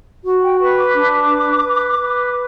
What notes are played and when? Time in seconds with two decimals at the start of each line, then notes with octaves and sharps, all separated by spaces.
0.24 F#4
0.42 G5
0.60 B4 C#6
0.77 D6
0.94 D4 D6
1.29 B4
1.64 B4
1.99 B4